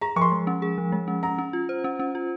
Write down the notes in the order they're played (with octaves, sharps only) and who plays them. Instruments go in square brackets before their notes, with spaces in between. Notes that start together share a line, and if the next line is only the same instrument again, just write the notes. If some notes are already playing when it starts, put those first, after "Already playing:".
[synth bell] G#4 [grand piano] A#5
[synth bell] F3 [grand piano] C#6
[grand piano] C6
[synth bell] G#3
C#4
G#4
F3
G#3
C#4
[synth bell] C#4 [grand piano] A#5
[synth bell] C#4
F4
C5
C#4
C#4
F4